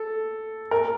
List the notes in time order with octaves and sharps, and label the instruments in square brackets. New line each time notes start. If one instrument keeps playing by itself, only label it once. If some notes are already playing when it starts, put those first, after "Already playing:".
Already playing: [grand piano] A4
A#4